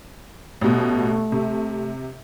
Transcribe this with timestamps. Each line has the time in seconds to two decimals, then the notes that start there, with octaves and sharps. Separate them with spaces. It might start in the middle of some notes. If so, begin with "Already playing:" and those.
0.61 A1 B2 A3
1.32 C3